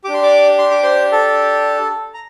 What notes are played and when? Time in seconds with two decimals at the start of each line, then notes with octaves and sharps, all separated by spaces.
0.04 G4 D6
0.09 D4
0.14 C6
0.22 D5 D6
0.59 C6
0.71 D6
0.83 C5 C6
1.12 A4 A5
2.14 A#5